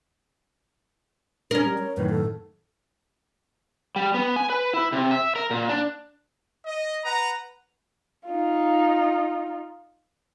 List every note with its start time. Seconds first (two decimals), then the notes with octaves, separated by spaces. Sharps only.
1.51 C#4 D4 A#4
1.64 G3
1.78 C#5
1.97 F#2 A2 D#3 B4
2.10 A4
3.96 G3
4.14 B3
4.36 G#5
4.50 B4
4.74 E4
4.93 C3
5.11 E5
5.36 A#4
5.51 A#2
5.69 D4
6.66 D#5
7.04 B4 F#5 A#5
8.27 D#4 F4